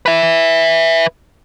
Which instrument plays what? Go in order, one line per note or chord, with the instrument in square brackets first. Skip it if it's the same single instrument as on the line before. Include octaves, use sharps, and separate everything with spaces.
[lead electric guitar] B4 E5